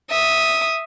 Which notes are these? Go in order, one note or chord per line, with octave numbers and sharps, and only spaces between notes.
E5 D#6